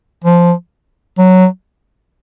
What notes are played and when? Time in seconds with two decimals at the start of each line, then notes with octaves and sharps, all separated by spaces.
0.24 F3
1.18 F#3